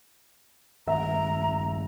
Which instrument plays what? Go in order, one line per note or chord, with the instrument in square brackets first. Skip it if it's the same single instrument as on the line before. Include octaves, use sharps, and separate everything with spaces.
[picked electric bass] G2 D#3 C4 [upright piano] E5 [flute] A#5